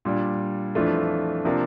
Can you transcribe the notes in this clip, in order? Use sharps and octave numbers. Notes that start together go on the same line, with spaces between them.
A#2 G3 D4
F2 E3 A3 D4 F4
C3 F3 A#3 D4